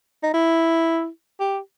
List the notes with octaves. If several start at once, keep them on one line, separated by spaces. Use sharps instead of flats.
D#4
E4
G4